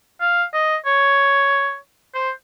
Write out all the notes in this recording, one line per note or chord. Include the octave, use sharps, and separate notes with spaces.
F5
D#5
C#5
C5